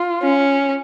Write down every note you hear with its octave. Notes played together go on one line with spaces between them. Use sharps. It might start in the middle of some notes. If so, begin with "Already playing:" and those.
Already playing: F4
C#4